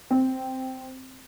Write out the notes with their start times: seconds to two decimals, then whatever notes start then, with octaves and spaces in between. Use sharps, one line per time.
0.11 C4